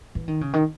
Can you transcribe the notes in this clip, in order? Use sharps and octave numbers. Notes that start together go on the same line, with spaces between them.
E3
D#3
C#3
D#3